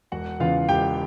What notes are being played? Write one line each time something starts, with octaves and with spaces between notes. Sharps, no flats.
E1 F#4 F#5
E2 C#3 E3 F4 F5
E1 G4 G5